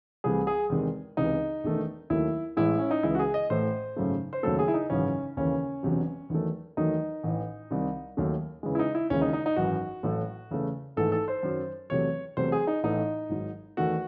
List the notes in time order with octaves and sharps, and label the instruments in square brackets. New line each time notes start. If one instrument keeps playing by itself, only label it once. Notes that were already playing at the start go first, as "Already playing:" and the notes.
[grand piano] C2 C3 E3 A3 G#4
G#4
E2 C3 D#3 G#3
C#2 C3 E3 D#4
E1 E2 D#3 A3
D#2 D#3 F#3 A3 E4
A1 A2 G#3 E4
C#4
D#4
C#2 C#3 E3 G#3 E4
F#4
G#4
D#5
A1 A2 E3 A3 C5
G#1 F#2 C#3 F#3 A3
C5
D#2 C#3 F#3 A3 A4
G#4
E4
D#4
G#1 F#2 C#3 E3 C#4
D#2 C#3 E3 C#4
E1 E2 C3 F#3
E2 D#3 F#3 A3
E2 D#3 F#3 A3 D#4
A1 A2 E3
C2 C3 D#3
D#2 D#3 F#3 A3
E2 C#3 E3 G#3
E4
D#4
E4
D#2 C#3 E3 G#3 C#4
D#4
D#4
D#4
G#1 F#2 E3 F#4
A1 A2 F#3 A3
E2 C#3 E3 A3
G#1 G#2 E3 A3 A4
A4
C5
F#2 D#3 F#3
E2 C3 F#3 A3 C#5
E2 C3 F#3 A3 C5
G#4
D#4
A1 A2 E3 A3 D#4
G#1 G#2 F#3
E2 D#3 A3 F#4